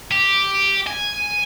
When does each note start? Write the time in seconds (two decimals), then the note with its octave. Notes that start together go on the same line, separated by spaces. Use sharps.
0.12 G4
0.87 G#5